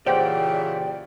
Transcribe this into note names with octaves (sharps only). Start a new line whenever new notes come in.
A#2 C#3 E3 G4 C5 D5 F#5 G5